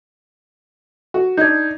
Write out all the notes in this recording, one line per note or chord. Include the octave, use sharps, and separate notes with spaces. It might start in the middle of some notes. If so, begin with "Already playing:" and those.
F#4
D4 D#4 G6 G#6